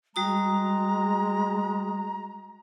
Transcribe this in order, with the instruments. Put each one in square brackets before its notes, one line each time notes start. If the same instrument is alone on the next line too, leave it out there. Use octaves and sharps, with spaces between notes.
[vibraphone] G3 F#4 D#6 [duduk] G#3 [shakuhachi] A#5